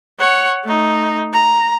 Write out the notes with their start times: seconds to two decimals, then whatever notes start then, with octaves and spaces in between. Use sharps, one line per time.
0.19 C#5 F#5
0.64 A3 D#4
1.33 A#5